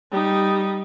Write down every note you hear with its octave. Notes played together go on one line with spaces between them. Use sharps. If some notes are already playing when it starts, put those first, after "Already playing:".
G3 D#4